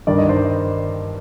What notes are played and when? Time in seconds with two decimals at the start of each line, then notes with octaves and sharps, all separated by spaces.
0.07 G2 D#3 D5
0.18 D#5
0.29 C5 D5